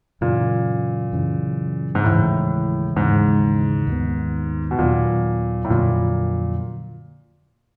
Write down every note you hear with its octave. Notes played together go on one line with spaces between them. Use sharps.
F#2 A#2 C#3 E3
F#2 C#3 E3
G#2
D#2 A2 C#3 E3 G#3
D#2 G#2 C#3 E3 G#3
D#2 D#3 F#3 B3
B2
D#2 A#2 D#3 F#3 B3
A2
F2 A#2 D3 F#3 A#3